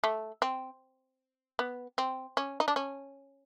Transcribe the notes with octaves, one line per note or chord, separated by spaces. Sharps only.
A3
C4
B3
C4
C#4
D#4
D4
C#4